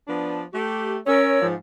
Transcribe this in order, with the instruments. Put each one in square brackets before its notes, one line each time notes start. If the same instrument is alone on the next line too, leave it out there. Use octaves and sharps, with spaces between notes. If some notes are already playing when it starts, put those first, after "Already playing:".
[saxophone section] F3 B3 D4
A3 G4
[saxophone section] C#4 [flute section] A#4 C#5 E6
[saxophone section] G#2 F3